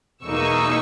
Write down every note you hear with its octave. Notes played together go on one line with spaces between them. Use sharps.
E2 B2 A#3 D#4 C#6 E6